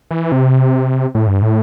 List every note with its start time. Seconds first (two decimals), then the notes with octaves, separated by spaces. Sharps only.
0.11 E3
0.32 C3
1.15 A2
1.27 G2
1.42 A2